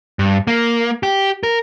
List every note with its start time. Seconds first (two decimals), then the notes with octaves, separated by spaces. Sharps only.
0.19 G2
0.47 A#3
1.03 G4
1.43 A#4